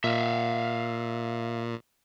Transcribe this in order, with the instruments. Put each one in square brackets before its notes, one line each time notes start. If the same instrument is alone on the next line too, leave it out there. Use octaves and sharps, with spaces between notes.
[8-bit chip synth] A#2 [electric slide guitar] E5 F5